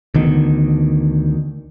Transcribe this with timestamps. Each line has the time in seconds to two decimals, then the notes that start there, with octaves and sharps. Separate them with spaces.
0.14 D2 D3 D#3 B3